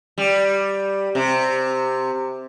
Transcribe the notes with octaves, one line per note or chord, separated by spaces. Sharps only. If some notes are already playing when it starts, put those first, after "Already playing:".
G3
C3